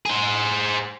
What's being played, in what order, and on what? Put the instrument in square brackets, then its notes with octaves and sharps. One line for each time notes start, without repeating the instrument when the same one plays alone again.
[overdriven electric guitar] G#4 C5